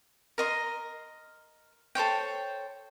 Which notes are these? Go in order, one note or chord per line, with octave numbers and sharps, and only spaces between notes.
A#4 D#5 C6
A4 C5 C#5 G5